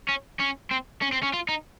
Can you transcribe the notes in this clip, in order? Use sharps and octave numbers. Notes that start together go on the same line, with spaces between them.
C#4
C#4
C4
C#4
C4
C#4
F4
D#4